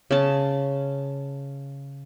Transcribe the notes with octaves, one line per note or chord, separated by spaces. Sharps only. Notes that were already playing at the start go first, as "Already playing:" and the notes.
C#3 A5